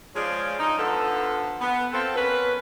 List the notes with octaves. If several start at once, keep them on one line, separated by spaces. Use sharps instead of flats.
F3 G#3 C#4 F4 G#4 D5
D#4
D3 F3 B3 F4 A4
B3
C4 F4 A4
B3 C#4 A#4 B4